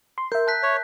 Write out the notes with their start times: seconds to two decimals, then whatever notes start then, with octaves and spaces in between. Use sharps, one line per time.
0.18 C6
0.32 A#4 E5 G6
0.47 A5 F#6 B6
0.63 C#5